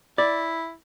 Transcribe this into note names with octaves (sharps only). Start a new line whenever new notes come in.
E4 D5